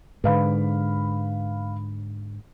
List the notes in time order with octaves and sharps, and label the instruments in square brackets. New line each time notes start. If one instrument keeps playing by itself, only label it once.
[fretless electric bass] G#2 D3 [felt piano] B4 F5 B5